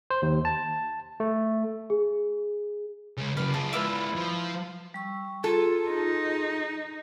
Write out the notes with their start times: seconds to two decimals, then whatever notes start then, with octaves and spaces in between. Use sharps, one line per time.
0.10 C5
0.22 D#2
0.45 A5
1.20 A3
1.90 G#4
3.17 C#3 G#3
3.37 C#3 F#3 B4 D5 F5
3.54 F4 G#4 A5
3.73 G#3 E4 F4 B4 D5
4.16 F3
4.94 G3 C#6 E6
5.44 F4 G#4 A4 A#5
5.90 D#4